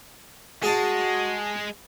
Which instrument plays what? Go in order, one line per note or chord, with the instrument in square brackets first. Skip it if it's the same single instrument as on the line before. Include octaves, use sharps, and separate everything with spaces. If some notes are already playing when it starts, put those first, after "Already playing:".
[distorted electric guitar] G#3 [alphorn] F#4 [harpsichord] G#4 D#5 A5